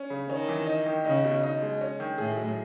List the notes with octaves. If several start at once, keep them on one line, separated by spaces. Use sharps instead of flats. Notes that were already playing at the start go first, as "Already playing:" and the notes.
Already playing: C#4
C#3
D#3 C#4
E3
D#4
D#3
C#3 D#4
B2
D#4
G#3
C#4
D#3
A2 G#4
F#3